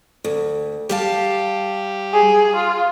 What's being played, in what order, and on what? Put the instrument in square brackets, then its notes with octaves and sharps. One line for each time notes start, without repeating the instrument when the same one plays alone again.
[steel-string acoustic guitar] D2
[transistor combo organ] G3 [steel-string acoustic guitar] G4 F5 A5
[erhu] G#4
F4